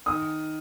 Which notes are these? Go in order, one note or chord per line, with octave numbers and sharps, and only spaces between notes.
D#3 D#6